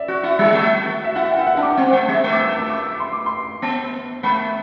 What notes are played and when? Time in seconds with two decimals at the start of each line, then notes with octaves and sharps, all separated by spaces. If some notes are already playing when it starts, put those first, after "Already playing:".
Already playing: D5 E5
0.08 F#4
0.23 E4
0.39 G3
0.54 A3
0.85 F#4
1.04 E5
1.15 E4 F#5
1.31 G5
1.36 E4 E5
1.47 F#5
1.57 D4
1.63 D6
1.77 C4
1.93 A3
2.08 G3
2.24 A3
2.32 D6
2.39 E6
2.59 E6
2.70 D6
3.00 C6
3.13 D6
3.26 C6
3.62 B3
4.23 A3 B5